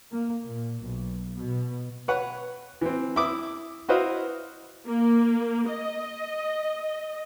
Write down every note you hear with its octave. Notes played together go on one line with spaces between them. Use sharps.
A#3
A#2
B1
B2
B4 C#5 F#5
E3 C4
E4 D6 D#6
E4 F#4 B4 C5 D#5 F5
A#3
D#5